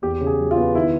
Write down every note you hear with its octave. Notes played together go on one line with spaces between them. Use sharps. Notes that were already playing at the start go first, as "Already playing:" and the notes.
E2 G4
C#3
G#4
F#3
F4
B3
D#3 E4